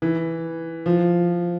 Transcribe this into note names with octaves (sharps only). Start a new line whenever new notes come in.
E3
F3